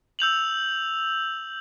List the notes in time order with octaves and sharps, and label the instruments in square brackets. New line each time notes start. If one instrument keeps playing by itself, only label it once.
[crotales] E6 G6 F7 F#7